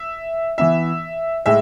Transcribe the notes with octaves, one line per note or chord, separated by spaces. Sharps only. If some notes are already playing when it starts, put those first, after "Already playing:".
Already playing: E5
E3 B3 E5
A2 G#3 E5